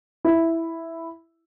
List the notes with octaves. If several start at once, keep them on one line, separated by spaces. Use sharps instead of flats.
E4